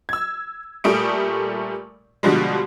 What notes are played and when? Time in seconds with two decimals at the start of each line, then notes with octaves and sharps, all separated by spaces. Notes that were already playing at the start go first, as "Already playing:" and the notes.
0.09 E6 G#6
0.84 A#2 G3 A3 D#6 D7
2.23 B2 D3 F3 G3 G#3